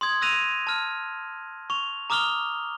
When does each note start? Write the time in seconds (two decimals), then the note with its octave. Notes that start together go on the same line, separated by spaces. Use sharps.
0.01 C6 D#6 G#6
0.22 E6 F#6 A#6 D#7 F7
0.67 A5 F6
1.70 C#6 F7
2.10 A#5 D6 D#6 F6 F7 G7